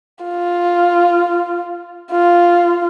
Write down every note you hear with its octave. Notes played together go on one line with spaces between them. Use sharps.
F4
F4